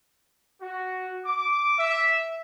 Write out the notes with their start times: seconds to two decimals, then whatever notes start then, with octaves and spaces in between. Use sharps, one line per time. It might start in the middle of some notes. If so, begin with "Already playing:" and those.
0.61 F#4
1.26 D6
1.78 E5